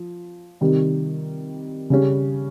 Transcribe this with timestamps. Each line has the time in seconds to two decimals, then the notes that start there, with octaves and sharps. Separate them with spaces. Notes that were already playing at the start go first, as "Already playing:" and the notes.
Already playing: F3
0.61 C3 D#3 G3
1.90 C#3 G3 C#4